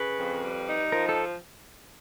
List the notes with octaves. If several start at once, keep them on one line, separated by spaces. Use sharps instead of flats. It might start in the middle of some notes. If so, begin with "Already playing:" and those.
Already playing: C#3 B4
F2
G3
D#4
F3 A#4
A4